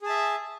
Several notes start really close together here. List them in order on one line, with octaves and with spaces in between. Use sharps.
G#4 A5 E5